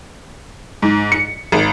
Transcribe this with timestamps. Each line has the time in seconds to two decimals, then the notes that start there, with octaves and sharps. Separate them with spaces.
0.82 G#2
1.12 C#7
1.52 G#1